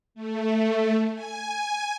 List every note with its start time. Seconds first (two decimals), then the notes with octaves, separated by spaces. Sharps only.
0.15 A3
1.14 G#5